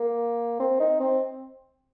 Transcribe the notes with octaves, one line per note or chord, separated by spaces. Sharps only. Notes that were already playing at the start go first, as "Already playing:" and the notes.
Already playing: A#3
C4
D#4
C4